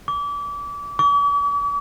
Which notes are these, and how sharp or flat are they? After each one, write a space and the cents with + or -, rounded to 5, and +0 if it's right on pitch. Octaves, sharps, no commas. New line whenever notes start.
D6 -30
D6 -45